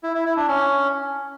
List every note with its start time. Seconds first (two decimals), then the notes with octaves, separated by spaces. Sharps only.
0.03 E4
0.14 E4
0.25 E4
0.36 D4
0.48 C#4